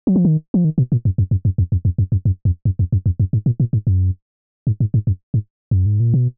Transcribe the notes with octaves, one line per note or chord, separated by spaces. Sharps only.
F#3
F3
D#3
F3
D#3
B2
A#2
F#2
F#2
F#2
F#2
F2
F2
F2
F#2
F#2
F#2
F2
F#2
F2
F#2
F2
F#2
G#2
A#2
A#2
G#2
F#2
G#2
G#2
G#2
F#2
G#2
F#2
G#2
A#2
B2